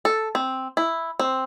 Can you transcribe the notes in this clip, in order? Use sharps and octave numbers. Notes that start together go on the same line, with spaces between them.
A4
C4
E4
C4